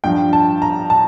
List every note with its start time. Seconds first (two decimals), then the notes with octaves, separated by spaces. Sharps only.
0.04 G2 F3 G5
0.33 A5
0.62 A#5
0.90 A5